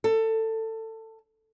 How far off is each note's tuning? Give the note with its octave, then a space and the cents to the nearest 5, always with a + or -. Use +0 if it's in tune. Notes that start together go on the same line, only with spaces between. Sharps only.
A4 +20